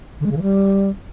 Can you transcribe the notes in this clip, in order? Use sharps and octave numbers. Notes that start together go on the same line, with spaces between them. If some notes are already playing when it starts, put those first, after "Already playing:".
D3
G#3
C#3
E3
G3